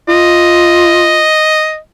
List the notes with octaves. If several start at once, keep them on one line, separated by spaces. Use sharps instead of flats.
F4 D#5